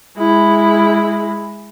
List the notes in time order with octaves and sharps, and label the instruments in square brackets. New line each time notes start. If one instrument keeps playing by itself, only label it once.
[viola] G#3 E4